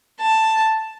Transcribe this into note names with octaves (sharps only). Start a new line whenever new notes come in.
A5